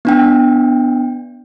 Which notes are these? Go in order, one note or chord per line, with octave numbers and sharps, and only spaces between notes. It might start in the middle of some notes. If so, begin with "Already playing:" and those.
B3 D4 G5